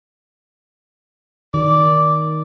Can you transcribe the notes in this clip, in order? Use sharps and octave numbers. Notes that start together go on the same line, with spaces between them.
D#3 D5